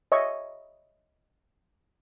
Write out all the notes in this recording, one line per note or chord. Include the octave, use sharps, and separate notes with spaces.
C#5 D#5 E5 C#6